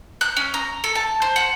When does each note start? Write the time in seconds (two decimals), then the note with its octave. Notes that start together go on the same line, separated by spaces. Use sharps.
0.21 F#6
0.37 C#4
0.54 A#5
0.84 A4
0.95 A5
1.22 C5
1.36 F#5